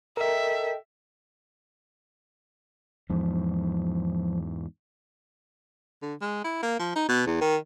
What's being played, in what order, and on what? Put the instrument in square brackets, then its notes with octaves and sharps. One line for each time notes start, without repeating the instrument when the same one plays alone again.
[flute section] A4 D#5 G5 [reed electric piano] A#4 [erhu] E5
[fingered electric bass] E2 G#2 [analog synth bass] F3
[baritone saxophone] D3
G#3
E4
A#3
F3
D#4
B2
E2
D#3